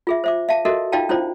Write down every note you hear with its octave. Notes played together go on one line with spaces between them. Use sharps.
F4 G#4 E5
C5 E5 D6
E5 F5 A5
F#4 A4 A#4 D#5 E5
D#4 F4 D5 F5 G5 A5
C#4 E4 F4 C5 D5